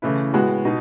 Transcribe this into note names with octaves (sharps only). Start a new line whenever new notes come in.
C#3 E3 A3 E4 B4
A2 G#3 B3 F#4
B2 D#4